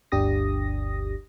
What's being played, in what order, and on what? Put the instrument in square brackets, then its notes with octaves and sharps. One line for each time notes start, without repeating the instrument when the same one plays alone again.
[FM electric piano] G1 D2 D4 G4 D#6 A#6